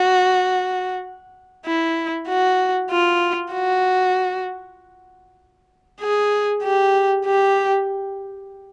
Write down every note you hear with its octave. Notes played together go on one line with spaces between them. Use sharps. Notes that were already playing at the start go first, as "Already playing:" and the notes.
Already playing: F#4
E4
F#4
F4
F#4
G#4
G4
G4